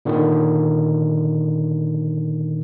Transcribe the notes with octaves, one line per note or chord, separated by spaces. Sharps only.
A#2 D3 D#3